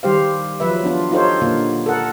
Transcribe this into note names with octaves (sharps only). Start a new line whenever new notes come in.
D#3 G3 G4 C5 F5
F3 F#3 B4 E5
B3 D4 F4
D#4 F4 G4 A4 C5 C#5
A#2 D3 A#3 F4
A4 A#4 F#5